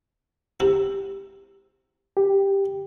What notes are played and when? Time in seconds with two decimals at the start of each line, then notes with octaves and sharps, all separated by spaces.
0.60 C3 E4
2.17 G4